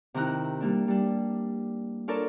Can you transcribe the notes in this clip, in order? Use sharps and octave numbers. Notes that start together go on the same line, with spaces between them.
C3 D#3 E4 A#5 F#6
G3 A#3 D4
G3 D4
D4 F4 A4 A#4 C#5 D5